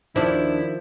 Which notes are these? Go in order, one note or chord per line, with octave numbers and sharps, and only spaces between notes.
D#2 D#3 F3 D4 E4